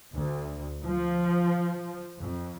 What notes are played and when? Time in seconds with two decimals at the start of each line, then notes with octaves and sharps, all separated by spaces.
0.15 D2
0.85 F3
2.19 F2